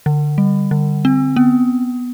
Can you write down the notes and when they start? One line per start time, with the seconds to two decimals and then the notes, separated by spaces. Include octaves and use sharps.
0.06 D3
0.38 G3
0.71 D3
1.05 C4
1.36 B3